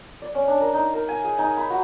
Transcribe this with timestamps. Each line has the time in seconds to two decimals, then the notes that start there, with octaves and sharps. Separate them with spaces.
0.22 D5
0.35 C#4
0.48 D4
0.60 A#4
0.74 D#4
0.94 A#4
1.09 G#5
1.24 G#4
1.39 D#4
1.57 B5
1.70 F#4